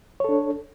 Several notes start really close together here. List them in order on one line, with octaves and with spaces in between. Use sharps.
C#5 A4 D4